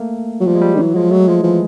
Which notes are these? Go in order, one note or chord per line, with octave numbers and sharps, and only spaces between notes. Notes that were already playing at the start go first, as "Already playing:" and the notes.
Already playing: A3 A#3
F#3
F3 G3
G#3
G3
D#3
E3 F#3
F3 G#3
F#3 A3
F3 G#3
E3 F3